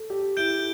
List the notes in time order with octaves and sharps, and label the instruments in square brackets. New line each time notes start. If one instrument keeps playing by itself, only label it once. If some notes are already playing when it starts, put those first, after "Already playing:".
Already playing: [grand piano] A4
G4
[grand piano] E4 [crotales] G6 D7 G7